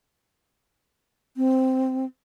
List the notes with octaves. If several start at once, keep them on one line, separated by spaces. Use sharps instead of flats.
C4